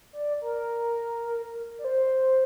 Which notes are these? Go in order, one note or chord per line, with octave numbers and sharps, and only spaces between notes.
D5
A#4
D5
C5